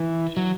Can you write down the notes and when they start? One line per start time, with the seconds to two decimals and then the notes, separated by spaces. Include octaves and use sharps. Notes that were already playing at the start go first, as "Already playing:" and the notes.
Already playing: E3
0.37 F#3